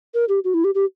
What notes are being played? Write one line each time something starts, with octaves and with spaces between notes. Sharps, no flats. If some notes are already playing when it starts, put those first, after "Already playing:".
A#4
G4
F#4
E4
G4
G4